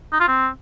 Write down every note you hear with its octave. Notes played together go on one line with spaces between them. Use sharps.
D#4
F4
C4